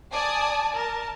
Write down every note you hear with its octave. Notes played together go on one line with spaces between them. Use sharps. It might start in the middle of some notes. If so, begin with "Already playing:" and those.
D5 G#5 A5 D#6
A#4 A5